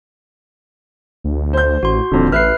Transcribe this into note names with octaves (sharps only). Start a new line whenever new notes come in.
D2
C5 G6
A1 F#4 C6
D#1 F2 D3
A1 B4 E5 F6 F#6 C7